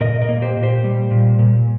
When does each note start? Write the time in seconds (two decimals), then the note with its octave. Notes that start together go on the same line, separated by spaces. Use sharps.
0.01 A#2 A#4 D#5
0.22 A#4 D#5
0.29 A#3
0.42 G4 C5
0.57 A#2
0.63 G4 C5
0.84 G3
1.11 A#2
1.39 A#2